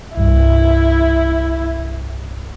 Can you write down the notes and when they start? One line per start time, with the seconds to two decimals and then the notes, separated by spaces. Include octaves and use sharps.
0.17 C2 G2 E4